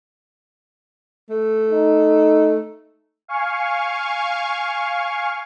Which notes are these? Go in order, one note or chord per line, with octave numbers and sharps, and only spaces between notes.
A3
D#4
F5 G#5 C#6